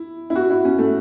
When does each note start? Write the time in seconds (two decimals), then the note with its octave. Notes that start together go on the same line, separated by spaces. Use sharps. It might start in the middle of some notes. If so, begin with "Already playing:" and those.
Already playing: E4
0.30 E4
0.35 F#4
0.50 E4
0.65 C#4
0.79 A3